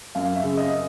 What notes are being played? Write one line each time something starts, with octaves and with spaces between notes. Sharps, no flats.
F#2 F5
E5
C#3
D#5